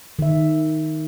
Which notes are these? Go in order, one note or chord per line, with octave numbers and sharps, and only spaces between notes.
D#3 E5